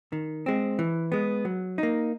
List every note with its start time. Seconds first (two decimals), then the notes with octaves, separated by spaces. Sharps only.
0.12 D#3
0.46 G#3 C4
0.79 E3
1.12 G#3 B3
1.45 F#3
1.78 A#3 D#4